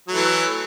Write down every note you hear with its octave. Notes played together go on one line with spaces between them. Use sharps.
E3 F#3 A3